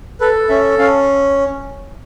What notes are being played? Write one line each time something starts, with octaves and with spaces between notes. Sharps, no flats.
A4 B4
C#4 E5
C#4 F5